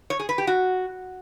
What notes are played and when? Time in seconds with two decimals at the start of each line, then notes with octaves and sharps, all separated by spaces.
0.10 C#5
0.19 G#4
0.29 B4
0.38 G4
0.47 F#4